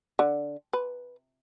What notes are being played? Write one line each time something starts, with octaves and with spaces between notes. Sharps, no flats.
D3
B4